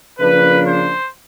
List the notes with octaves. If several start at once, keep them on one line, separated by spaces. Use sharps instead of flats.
C#3 F3 A#3 D4 B4
C5